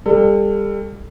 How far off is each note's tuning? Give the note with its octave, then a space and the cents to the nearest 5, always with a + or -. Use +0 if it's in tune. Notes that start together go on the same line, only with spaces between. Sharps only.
G3 +35 A4 +20